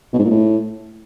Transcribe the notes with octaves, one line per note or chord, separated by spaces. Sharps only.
B2
G#2
A#2
A2